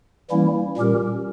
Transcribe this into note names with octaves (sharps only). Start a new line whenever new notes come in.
E3 G3 A#3 C#4 E4
A#2 G3 C#4 G4 A#4